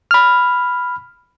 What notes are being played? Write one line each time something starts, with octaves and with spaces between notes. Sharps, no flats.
B5 F6